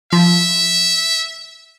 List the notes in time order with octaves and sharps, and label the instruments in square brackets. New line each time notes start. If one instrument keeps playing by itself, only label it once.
[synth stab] F3 [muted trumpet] E5